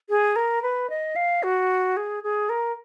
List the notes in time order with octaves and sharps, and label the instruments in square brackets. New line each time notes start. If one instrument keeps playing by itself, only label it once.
[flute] G#4
A#4
B4
D#5
F5
F#4
G#4
G#4
A#4